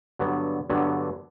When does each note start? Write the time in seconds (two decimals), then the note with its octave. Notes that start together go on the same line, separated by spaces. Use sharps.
0.19 G2 D3 F#3 B3
0.70 G2 D3 F#3 B3